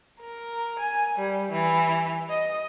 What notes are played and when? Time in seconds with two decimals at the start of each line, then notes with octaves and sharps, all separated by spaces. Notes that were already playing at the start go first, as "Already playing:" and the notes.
0.21 A#4
0.79 G#5
1.19 G3
1.52 E3
2.31 D#5